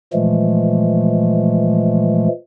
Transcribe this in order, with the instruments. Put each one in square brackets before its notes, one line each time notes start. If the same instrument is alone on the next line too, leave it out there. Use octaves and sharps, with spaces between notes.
[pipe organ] A#2 E3 F3 G#3 A3